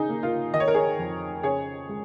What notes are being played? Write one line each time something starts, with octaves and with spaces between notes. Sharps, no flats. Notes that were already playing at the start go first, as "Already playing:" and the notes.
Already playing: C#3 D#4 G#4
A#3
F4 A#4
D#3 D#5
C#5
A#4
G#4 C#5
F2
C#3 G#4 C#5
G#3